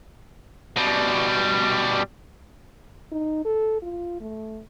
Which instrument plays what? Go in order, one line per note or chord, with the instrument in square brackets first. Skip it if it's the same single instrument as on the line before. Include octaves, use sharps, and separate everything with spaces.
[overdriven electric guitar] B2 G3
[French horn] D#4
A4
F4
A3